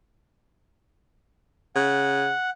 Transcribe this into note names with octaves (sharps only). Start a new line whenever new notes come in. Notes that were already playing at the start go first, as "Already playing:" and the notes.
C#3 F#5